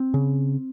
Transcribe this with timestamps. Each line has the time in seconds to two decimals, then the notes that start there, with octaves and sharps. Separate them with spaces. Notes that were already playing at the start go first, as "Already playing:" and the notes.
Already playing: C4
0.14 C#3